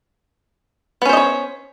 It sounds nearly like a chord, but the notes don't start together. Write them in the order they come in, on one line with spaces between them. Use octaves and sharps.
B3 C#4 C5 D#5 C#5